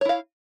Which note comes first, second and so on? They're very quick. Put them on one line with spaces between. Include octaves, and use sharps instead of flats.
C#5 E4 F5